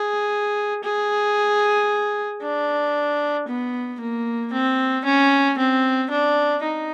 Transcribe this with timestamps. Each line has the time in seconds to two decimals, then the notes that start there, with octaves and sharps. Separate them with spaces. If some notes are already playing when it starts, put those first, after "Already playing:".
Already playing: G#4
0.83 G#4
2.42 D4
3.48 B3
4.00 A#3
4.53 C4
5.05 C#4
5.58 C4
6.10 D4
6.63 D#4